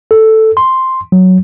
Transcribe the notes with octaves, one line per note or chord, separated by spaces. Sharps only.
A4
C6
F#3